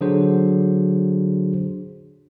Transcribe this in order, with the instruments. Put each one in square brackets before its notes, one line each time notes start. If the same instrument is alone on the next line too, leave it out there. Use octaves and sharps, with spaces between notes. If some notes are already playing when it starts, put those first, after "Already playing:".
[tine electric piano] D3 F#3 D4 F#4 G#4 C5